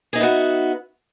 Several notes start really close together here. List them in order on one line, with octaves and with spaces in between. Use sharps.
G#4 D#4 E5 B3 F#4